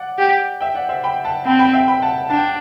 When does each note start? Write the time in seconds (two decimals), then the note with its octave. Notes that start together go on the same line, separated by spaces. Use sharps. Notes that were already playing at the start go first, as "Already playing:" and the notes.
Already playing: D5 F#5
0.18 G4
0.61 E5 G5
0.75 D5 F#5
0.89 C5 E5
1.04 G5 B5
1.25 F#5 A5
1.46 C4 G5 B5
1.59 G5 B5
1.73 E5 G5
1.88 G5 B5
2.02 F#5 A5
2.30 D4 A5
2.37 G5
2.45 F#5